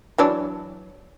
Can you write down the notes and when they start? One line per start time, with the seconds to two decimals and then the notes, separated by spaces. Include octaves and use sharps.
0.18 E3 F#3 D4